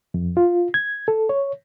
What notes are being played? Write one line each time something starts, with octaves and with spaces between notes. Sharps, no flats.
F2
F4
G#6
A4
C#5